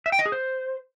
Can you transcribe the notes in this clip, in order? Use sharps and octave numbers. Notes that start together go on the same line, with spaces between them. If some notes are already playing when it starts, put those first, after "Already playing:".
E5
G5
D#5
G#4
C5